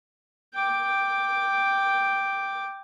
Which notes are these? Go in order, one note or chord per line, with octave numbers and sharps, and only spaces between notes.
G5 D6